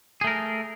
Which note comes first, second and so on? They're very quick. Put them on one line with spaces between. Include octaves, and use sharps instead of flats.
G#4 A3 A#4